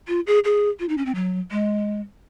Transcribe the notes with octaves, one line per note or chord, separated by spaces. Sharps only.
F4
G#4
G#4
F4
D#4
C#4
C4
F#3
G#3